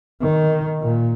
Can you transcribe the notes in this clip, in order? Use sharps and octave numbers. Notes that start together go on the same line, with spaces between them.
D#3
A#2